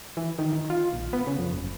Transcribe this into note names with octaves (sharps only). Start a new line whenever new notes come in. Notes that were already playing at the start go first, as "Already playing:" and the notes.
E3
D#3
D#3
F4
A#1
B3
C#3
F2
F#1